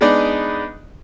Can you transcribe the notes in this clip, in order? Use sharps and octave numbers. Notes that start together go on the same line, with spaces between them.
G#3 B3 D4 D#4 D5